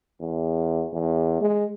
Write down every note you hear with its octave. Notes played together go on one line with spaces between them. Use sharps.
E2
E2
G#3